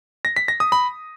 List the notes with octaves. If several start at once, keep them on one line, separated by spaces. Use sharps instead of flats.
A#6
B6
A#6
D#6
B5